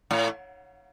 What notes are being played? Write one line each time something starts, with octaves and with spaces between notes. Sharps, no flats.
A2